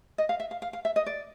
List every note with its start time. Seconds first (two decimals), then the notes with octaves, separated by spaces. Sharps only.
0.18 D#5
0.29 F5
0.40 E5
0.51 F5
0.62 F5
0.73 F5
0.85 E5
0.96 D#5
1.06 D5